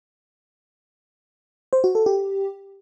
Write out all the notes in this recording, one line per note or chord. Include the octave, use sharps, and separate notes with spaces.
C5
F#4
A4
G4